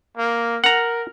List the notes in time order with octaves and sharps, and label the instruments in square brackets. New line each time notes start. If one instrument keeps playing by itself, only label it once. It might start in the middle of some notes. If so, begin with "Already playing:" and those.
[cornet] A#3
[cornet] A#4 [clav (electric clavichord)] F#5 A#5